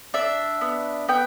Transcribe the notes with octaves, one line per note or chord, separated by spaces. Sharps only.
D4 E5
B3
B3 G5